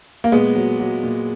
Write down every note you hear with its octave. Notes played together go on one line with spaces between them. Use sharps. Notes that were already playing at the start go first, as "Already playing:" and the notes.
A#3
A#2 G#3 B3
F#3
F#3
A#2